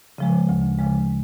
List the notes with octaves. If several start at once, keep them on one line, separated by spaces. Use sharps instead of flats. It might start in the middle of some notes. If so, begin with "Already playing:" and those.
C#3 F3 G#3
D2
C#3 F3 G#3